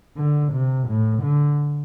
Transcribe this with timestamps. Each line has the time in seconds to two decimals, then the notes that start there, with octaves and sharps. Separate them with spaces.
0.17 D3
0.53 C3
0.88 A2
1.23 D3